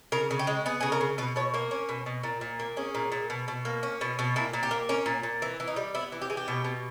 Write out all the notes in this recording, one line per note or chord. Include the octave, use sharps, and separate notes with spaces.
C#3 A#4
C#3
G4
G#3
B3 G#4
C#3 G#4
A#4
C#3
B2 B4
B2 C#5
A#3 A#4
C#4
B2
B2
A#2
A#2
A#3
C#4 G#4
A#2
A#2
B2
B2
A#3
C#4
B2
B2
A#2 E4
A#2
G4
A#3
C#4 A#4
A#2
A#2
E3
E3
D#4
G3
B3 E4
E3
G4
E3 G#4
G4
B2
B2